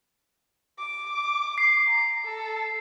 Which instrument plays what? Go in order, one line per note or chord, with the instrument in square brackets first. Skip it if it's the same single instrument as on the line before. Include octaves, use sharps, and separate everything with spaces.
[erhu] D6
[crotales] C7
[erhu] A#5
A4